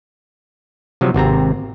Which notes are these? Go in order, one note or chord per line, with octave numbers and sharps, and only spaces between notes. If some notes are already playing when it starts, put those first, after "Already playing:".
C3 F3 F#3
G#1 C3 C4 A#5